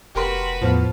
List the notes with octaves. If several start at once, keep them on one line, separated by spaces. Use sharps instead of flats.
F1 F#4 G4 A#4 B4 C6
E2 A2 F3 B3 F4